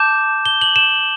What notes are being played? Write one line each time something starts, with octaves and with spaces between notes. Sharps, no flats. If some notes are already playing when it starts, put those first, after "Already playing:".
Already playing: A5 D6 G6 E7
G7
F#7
E7